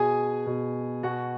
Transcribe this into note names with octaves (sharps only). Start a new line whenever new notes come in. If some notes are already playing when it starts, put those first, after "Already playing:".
Already playing: B2 G#4 G#5
B2
B2 F#4 F#5